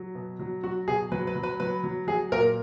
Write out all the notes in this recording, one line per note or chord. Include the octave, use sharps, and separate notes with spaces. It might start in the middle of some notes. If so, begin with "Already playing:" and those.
Already playing: F#3
B2
F#3
F#3 F#4
B2 G#4
F#3 B4
B4
F#3
B4
F#3 B4
F#3
F#3 G#4
A#2 A#4